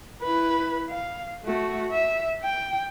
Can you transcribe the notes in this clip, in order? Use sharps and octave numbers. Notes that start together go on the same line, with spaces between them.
E4 B4
F5
A3 F#4
E5
G5